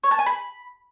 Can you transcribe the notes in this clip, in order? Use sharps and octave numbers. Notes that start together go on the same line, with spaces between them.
C#5
A5
G#5
B5